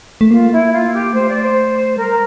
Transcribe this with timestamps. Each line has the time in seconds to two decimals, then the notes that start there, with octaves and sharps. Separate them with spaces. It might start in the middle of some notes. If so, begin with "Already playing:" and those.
0.21 A3
0.31 A#3 F4
0.52 E4
0.72 F4
0.93 G4
1.13 A3 C5
1.28 D5
1.42 C5
1.96 G3 A#4